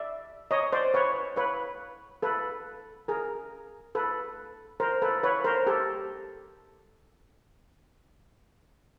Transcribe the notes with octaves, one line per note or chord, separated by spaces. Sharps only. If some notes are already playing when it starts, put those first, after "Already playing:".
Already playing: D5 E5
C#5 D#5
C5 D5
B4 C#5
B4 C#5
A4 B4
G#4 A#4
A4 B4
A#4 C5
A4 B4
B4 C#5
A#4 C5
G4 A4